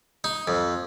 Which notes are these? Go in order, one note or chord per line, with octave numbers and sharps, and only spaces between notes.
D#4
F2